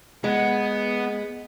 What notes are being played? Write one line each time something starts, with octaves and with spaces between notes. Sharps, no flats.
G#3 B3